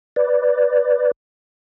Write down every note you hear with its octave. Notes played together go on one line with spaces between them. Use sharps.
B4 D5